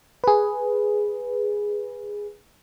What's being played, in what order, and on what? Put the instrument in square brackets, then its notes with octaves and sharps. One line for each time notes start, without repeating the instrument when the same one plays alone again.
[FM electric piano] G#4 B4